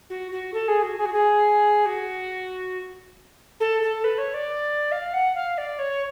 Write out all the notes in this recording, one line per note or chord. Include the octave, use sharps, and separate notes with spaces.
F#4
F#4
A4
G#4
F#4
G#4
F#4
G#4
F#4
A4
A4
B4
C#5
D5
F5
F#5
F5
D5
C#5